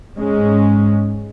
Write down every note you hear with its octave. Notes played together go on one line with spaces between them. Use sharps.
G#2 G#3 C#4